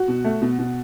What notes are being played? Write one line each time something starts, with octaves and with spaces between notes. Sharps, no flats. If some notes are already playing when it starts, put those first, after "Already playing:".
Already playing: F#4
B2
A3
B2
B2